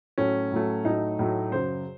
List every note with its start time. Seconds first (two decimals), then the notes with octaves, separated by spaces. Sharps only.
0.18 A2 F#3 A3 C#4
0.52 A2 F#3 A3
0.84 A2 F#3 A3 D#4
1.19 A2 F#3 A3
1.52 F#2 C#3 F#3 C5